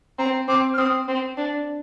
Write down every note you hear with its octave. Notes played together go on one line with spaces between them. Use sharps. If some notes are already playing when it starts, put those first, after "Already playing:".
C4 A#5
C4 D6
F6
C4 D#6
C4
D4